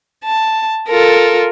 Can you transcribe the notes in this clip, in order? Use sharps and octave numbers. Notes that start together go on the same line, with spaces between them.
A5
F4 A4 A#4